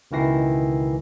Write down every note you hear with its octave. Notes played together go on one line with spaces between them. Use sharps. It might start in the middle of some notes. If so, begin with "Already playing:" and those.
C#2 B2 D#3 E3 A#6 C7